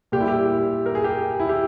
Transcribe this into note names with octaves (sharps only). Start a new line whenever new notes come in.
A#2 G3 G4
E4
G4
A#4
G#4
G4
E4
G4